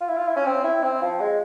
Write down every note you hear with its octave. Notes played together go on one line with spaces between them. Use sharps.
F4
E4
F4
E4
C#4
C4
E4
C4
F3
G#3